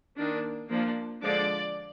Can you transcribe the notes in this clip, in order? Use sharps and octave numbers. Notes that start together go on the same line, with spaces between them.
D#3 A#3 D4
F3 A#3 D4
D3 F3 G#3 D4 D5